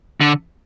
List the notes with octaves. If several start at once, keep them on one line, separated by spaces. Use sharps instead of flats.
D3